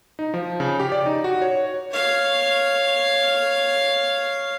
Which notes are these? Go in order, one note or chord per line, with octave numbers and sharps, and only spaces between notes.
D#4
F3
C#3
G4
D5
D#4
F#4
C#5
C#5 F5